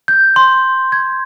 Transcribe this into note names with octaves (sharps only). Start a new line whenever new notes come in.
G6
C6
G#6